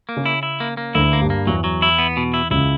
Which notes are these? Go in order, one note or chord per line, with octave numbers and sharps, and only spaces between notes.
A#3
C#3 C#4
E4
E4
A#3
A#3
D2 D3 E4
A#3
G2 G3
A#3
E2 E3 F#3
F#3
E4
B3
B2
E4
C#2 C#3 E4